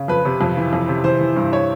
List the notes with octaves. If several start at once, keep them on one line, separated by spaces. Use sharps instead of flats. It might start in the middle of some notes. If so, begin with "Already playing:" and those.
Already playing: C#3
F2 B4
C3
F2
E3
F2
C3
E3 C5
E3
G2
C#5